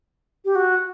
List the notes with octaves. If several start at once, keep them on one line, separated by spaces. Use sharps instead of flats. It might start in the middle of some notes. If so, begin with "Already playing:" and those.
G4
F#4